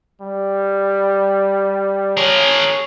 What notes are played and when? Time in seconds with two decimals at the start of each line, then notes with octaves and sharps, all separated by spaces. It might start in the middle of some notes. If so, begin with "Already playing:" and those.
0.21 G3
2.17 G#4 A#4 C#5